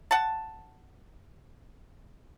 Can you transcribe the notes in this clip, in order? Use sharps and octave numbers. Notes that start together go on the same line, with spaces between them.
F#5 A5